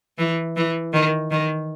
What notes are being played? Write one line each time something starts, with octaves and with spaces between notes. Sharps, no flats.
E3
E3
D#3
D#3